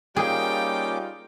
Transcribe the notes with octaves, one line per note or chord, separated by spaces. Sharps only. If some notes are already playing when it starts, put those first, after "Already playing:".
G3 A#3 C#4 D#4 F4 G#4 G5 D6